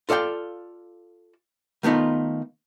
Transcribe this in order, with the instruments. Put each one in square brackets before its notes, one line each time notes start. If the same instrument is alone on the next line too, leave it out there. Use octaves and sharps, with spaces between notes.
[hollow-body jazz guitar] F4 A4 D5 F5 G5
D#3 A3 B3 D#4 F4